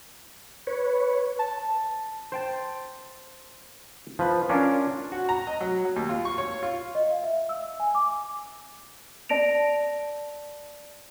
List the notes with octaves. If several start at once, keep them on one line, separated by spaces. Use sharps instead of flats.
B4 C#5
A5
C5 G5 A5
F3 B4
C#4 D4 F4 A#4
F#4
A#5
D#5
F#3
F#3
D#2
F4
C#6
C#5
F4
D#5
F5
E5
E6
G#5
D6
D5 A5 A#6 D7 F7